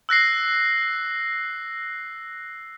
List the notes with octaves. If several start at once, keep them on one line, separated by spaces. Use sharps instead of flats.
E6 F#6 A#6 C7